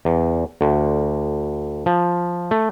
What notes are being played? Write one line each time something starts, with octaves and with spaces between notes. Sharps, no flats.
E2
D2
F3
A3